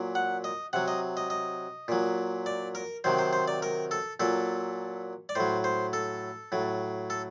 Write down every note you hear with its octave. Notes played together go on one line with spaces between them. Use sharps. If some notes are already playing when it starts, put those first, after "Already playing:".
Already playing: A#2 F#3
F#5
D#5
C3 F#3 F#5
D#5
D#5
D#5
A#2 F#3
D5
A#4
C3 D#3 F#3 C5
C5
C5
D5
A#4
A4
A#2 F#3 A4
D5
A2 F#3 C5
C5
A4
A2 F#3
A4